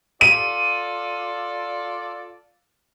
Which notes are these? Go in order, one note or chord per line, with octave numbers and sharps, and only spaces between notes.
F4 A4 D5 D#7